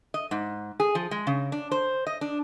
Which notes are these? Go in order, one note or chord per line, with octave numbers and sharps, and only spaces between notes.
D#5
G#2
G#4
F3
G#3
C#3
D4
C5
D#5
D4